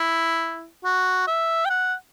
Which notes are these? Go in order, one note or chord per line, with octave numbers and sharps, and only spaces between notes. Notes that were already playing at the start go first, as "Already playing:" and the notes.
Already playing: E4
F#4
E5
G5
F#5